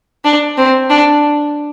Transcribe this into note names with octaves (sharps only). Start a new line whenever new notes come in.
D4
C4
D4